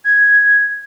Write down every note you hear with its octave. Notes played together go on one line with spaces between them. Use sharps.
G#6